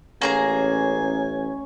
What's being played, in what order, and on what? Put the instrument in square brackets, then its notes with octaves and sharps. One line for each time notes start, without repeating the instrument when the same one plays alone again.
[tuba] A1 [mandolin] A#3 G#4 A#5 [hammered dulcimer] C#4 [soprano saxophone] G#5